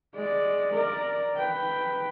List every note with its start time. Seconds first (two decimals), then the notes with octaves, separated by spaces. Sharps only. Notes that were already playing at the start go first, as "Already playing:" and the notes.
0.14 G#3 D5
0.73 A#4 D5
1.37 B4 G5